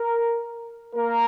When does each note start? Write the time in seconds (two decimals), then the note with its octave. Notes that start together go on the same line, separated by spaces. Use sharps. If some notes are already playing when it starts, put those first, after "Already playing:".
Already playing: A#4
0.96 A#3 A#4